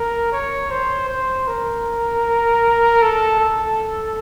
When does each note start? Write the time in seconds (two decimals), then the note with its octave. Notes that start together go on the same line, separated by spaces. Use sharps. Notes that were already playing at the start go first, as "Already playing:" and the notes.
Already playing: A#4
0.32 C#5
0.71 C5
1.08 C5
1.47 A#4
3.02 A4
3.40 A4